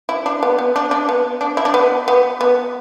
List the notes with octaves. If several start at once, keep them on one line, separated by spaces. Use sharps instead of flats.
E4
D4
B3
B3
D4
D4
B3
D4
E4
D4
B3
B3
B3